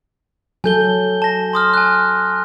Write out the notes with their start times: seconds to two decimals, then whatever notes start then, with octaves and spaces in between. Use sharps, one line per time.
0.64 F#3 A4 G#5 G6 G7
1.22 A5 A#6
1.53 C6 D#6 F6
1.74 G#5 F#6